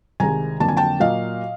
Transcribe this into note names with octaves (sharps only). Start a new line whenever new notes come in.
C2 C3 D#3 G#3 G#5 A#5
F2 D3 F#3 A#3 A5
G#5
G5 A5
A#2 F#3 A#3 D#5 F5